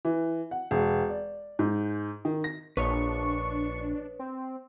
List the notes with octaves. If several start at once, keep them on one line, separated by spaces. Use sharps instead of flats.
E3
F#5
E1
D5
G#2
D#3
A#6
A#1 D4 B4 C#5 D#5 C#6
C4